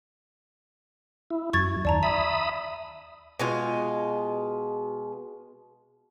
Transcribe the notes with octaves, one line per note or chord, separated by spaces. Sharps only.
E4
F#2 C#6 G#6 A6
D#2 D5 A5 A#5
E5 B5 D#6 B6
B2 G#3 F4